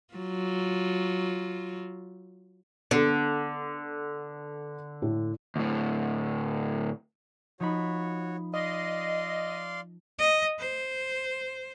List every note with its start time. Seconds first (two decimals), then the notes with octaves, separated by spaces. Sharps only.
0.14 F#3 F4
2.91 D3 B3 D4 A4
5.02 A2
5.56 D2 A2
7.60 F3 D#4 F#4 C#5 B5
8.54 D5 D#5 F5 C6
10.18 D#5
10.59 C5